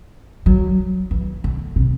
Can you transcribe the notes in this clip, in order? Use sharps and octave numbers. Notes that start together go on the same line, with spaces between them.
F#3
E3
D3
C3